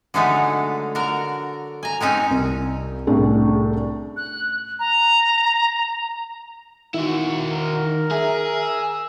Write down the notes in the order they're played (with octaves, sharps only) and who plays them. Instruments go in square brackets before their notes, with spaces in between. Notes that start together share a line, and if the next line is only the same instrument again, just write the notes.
[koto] D3 F#3 G#3 A3 B3 D#4
D3 F#4 A#4 A#5
G#5 A#5
G#3 C4 C#4 D#4
[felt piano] C2
C2 A2 C#4 D4 G#4
[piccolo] F#6
A#5
[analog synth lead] D#3 [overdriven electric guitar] E4 F#4
[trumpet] A#4
[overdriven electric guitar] G#4 [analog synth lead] E5
[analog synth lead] E6